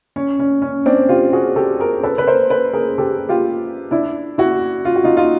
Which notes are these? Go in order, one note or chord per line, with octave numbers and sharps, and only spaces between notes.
C#4
C#4
C#4
C4 D4
F4 G4
F#4 G#4
G4 A4
G#4 A#4
A4 B4
B4
A#4 C5
A4 B4
G#4 A#4
G4 A4
F4 G4
D4 E4
E4 F#4
F4
F#4
D#4 F4
D#4 F4